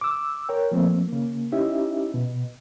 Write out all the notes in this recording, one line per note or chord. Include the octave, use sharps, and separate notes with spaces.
D6 E6
A#4 C#5 G5
F3 A3 A#3 C4
C#3 A#3
C#4 D#4 E4 G4 E5
B2